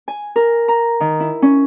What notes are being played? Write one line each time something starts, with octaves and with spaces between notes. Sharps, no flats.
G#5
A#4
A#5
D#3
E4
C#4